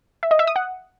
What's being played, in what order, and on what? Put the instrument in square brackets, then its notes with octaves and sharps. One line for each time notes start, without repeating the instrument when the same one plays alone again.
[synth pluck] E5
D#5
E5
D#6
F#5